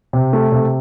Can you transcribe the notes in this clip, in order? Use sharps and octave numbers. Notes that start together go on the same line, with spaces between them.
C3
A3
C3